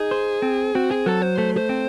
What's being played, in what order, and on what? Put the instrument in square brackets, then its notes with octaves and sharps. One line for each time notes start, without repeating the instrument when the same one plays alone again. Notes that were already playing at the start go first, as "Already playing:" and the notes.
Already playing: [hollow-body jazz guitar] D#4 [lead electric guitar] G#4
[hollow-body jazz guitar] C5
C4
[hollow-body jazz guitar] C4 [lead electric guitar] F#4
[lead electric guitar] G#4
[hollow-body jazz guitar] F#3 [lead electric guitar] A4
[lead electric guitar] C5
[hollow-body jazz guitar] A3 [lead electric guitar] C5
[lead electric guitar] C5
[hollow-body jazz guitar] C4